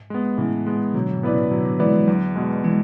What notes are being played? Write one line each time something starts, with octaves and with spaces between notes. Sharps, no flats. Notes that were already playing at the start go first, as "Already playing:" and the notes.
Already playing: G#2
G#3 B3
A2 C#3 E3
G#3 B3
B2 D3 F#3
G#2 B2
B3 E4 B4 D5
A2 C#3
B2 D3 F#3
B2 D3
E3 G#3 B3 E4 B4 D5
E3 G#3
E2 D3 F#3
B2 G#3
E3 G#3